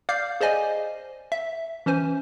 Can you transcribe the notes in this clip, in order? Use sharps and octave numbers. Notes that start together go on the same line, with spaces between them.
D5 F5 D6 F6 G6 C7
G#4 C5 D5 D#5 G#5
E5
E3 C#4 C5 G#5